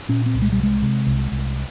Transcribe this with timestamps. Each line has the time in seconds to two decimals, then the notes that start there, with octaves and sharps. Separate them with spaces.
0.09 A#2 C#4
0.26 C4
0.34 C2
0.42 G#3
0.52 G3
0.58 C3
0.63 G#3
0.82 C3
1.07 C2
1.32 C2